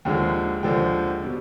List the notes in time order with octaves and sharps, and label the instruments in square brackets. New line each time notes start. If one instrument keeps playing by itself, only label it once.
[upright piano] D#2 D3 F3 G#3 G5
D#2 D3 F3 G#3 G5
B2 G3